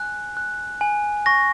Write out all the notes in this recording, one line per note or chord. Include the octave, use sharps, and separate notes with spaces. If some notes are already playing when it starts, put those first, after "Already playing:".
Already playing: G#5 F#6
F#6
G#5
C#6 A#6